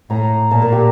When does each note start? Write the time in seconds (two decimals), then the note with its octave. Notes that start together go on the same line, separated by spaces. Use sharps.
0.10 A2 A#5
0.51 A#2 A5
0.62 A#4
0.72 G4